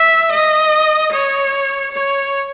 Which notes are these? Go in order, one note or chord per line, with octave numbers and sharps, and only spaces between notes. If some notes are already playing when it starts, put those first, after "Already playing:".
Already playing: E5
D#5
C#5
C#5